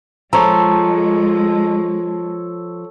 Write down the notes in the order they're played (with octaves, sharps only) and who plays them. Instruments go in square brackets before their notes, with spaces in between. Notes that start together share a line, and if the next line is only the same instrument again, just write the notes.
[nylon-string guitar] F3 [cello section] G#3 [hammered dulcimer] A4 C#5 [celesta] A#5